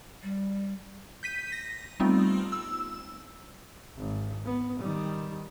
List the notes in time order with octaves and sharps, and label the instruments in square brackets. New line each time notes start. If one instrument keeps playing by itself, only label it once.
[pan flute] G3
[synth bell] G6 B6 D#7
A#6
G3 A3 B3 C4 D#4 F4
E6
[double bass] G#1
B3
D#3 G3